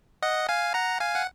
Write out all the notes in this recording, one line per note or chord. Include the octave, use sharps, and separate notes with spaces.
D#5 F#5
F5 G#5
F#5 A#5
F5 G#5
F#5